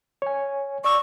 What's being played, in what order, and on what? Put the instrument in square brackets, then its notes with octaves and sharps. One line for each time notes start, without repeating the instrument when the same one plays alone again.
[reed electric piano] C#5 G#5
[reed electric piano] D5 E6 [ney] C#6